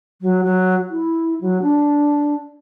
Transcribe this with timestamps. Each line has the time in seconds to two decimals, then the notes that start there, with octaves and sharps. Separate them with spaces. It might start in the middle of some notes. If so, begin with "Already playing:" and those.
0.22 F#3
0.44 F#3
0.90 E4
1.41 F#3
1.62 D4